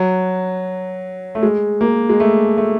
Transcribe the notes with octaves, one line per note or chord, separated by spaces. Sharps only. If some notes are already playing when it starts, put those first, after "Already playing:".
Already playing: F#3
A3
G#3
A#3
G#3
A3
A3